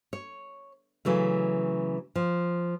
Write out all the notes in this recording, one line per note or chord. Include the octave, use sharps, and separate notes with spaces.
C#5
C#3 E3 F#3 A3
F3